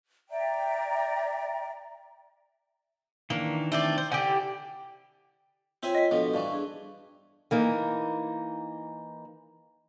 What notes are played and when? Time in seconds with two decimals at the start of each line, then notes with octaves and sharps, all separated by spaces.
0.29 D5 E5 G5 A#5
3.30 D#3 E3 A#3 D4
3.72 A3 C4 D5
3.98 C5
4.12 D3 G4 F#5 G#5 G6
4.28 E4
5.83 C4 F4 C#5 E5 G5 G#5
5.95 D#5 B6
6.11 B2 F3 D4 A4
6.34 G2 E3 F5 A5 C#6
6.52 D4 G#4
7.51 E3 A#3 D#4